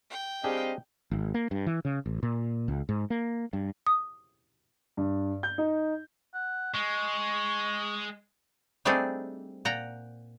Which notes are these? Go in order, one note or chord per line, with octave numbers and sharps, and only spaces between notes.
G5
G3 C4 D4 G4 G#4 D#5 F5
G#1
A#3
G2
E3
C#3
A1
A#2
C#2
G#2
A#3
G2
D#6
G2
G6
D#4
F#5
G#3 C#6
G3 A3 C4 D4 D#4 G#4
A#2 F#5 G5 A#5